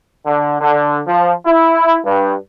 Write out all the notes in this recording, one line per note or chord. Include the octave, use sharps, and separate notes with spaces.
D3
D3
F3
E4
G2